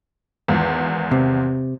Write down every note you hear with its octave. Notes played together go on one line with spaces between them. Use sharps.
G#1 E2
C3